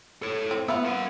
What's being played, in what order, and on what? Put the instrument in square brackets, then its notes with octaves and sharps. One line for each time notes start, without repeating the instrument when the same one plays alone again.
[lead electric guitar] A4 C#5
[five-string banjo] C4
[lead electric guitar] B3 [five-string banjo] F4 B4 E5
[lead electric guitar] A#4 F#5